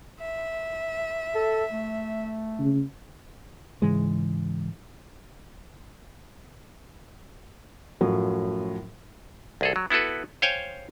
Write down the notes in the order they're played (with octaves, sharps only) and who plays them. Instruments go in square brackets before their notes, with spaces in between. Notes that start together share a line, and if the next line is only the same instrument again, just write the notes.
[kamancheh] E5
[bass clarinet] A4
A3
[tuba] C#3
[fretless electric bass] G#2 C#3 E3 G#3
[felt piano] F#2 A2 F3 F#3
[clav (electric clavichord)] C2 G#4 A4
F#3
B3 E4 F#4 A4 B4
C5 C#5 F5 G5 G#5